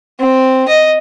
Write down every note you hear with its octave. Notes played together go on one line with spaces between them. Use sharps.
C4
D#5